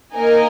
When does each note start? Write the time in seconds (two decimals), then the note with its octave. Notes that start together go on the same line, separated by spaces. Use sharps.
0.14 A#3 D#4 A#4 D#5 G#5